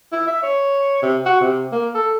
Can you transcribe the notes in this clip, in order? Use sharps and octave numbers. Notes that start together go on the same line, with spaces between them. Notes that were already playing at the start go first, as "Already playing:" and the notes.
E4
E5
C#5
C3
F#4
C3
A#3
A4